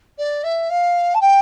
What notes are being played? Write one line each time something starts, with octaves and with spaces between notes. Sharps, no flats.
D5
E5
F5
A5
G5